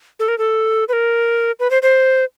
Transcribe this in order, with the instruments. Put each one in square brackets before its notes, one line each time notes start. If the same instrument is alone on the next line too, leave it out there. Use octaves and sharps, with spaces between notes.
[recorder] A4
A#4
A4
B4
A#4
B4
C5
C5